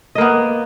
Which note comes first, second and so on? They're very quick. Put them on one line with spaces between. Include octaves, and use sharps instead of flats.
D#5 A#3 B3